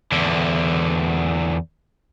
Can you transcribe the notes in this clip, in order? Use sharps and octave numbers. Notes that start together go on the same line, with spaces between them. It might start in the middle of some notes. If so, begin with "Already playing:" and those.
E2 D3